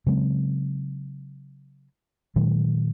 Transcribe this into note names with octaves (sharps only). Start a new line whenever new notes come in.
C#3 F#3 G#3 C4
A#2 D#3 F#3 G#3